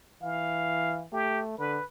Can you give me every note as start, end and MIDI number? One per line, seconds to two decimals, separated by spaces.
0.22 1.06 52
0.22 1.03 77
1.12 1.55 57
1.12 1.42 67
1.59 1.78 50
1.59 1.84 71